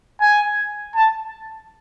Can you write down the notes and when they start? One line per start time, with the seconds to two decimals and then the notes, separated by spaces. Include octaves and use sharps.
0.21 G#5
0.95 A5